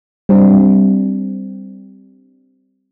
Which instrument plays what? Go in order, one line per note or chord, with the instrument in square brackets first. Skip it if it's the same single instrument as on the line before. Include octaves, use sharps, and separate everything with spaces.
[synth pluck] G3 C4 D4